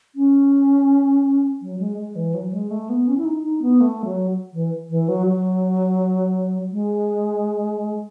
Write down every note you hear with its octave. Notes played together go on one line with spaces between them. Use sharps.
C#4
F#3
G#3
G#3
E3
F#3
G#3
A3
B3
C#4
E4
D#4
D#4
B3
A3
F#3
E3
E3
F#3
F#3
G#3